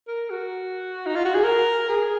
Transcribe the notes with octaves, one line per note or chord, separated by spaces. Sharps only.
A#4
F#4
D#4
F4
F#4
G#4
A#4
G#4